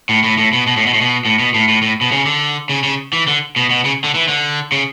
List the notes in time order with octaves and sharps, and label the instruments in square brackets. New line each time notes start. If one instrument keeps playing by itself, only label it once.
[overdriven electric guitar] A2
A2
A2
B2
B2
A2
B2
A2
B2
A2
B2
A2
A2
A2
B2
C#3
D3
C#3
C#3
E3
D3
B2
B2
C#3
D3
E3
D3
C#3